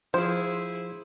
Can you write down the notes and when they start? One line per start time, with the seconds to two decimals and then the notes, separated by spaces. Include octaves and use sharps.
0.14 F3 E4 G#4 C5